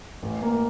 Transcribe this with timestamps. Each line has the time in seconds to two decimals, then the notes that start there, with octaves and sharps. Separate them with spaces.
0.23 A1
0.42 A#3